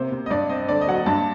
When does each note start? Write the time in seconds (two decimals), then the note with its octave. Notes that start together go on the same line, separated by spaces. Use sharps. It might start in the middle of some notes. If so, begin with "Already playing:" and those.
Already playing: C3 A#3 C5
0.12 C3
0.26 D#5
0.30 G2 D5
0.49 C4 D#5
0.69 D3 D5
0.81 D#5
0.87 F#3 F#5
0.94 D#5
1.06 G2 A5